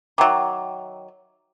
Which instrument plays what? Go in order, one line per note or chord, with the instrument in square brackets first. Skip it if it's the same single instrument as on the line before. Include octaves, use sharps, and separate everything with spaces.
[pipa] D#3 F#3 [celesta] E5 G5 D6